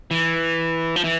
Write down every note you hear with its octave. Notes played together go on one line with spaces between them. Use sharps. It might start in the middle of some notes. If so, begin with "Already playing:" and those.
E3
F3
E3